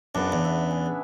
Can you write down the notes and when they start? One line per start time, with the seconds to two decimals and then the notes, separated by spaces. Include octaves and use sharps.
0.15 F#2 C#3 B3 D4
0.32 E2
0.45 E5
0.71 G#4